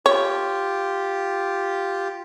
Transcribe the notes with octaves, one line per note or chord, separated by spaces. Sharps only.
F4 G4 C#5